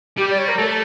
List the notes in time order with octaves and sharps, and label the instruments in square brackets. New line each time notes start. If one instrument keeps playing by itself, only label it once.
[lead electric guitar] G3 [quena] G4
[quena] D5
C#5
A#4
[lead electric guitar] A3 [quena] A4